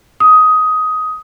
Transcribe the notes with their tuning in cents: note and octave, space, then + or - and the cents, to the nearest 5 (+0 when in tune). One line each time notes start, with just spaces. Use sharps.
D#6 +15